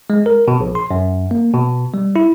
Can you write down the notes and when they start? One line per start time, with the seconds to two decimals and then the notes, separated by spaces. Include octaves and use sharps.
0.10 G#3
0.26 A#4
0.48 B2
0.60 A#1
0.75 C6
0.91 F#2
1.31 A#3
1.53 B2
1.94 G3
2.16 E4